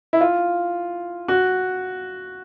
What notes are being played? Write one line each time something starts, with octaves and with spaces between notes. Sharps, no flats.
E4
F4
F#4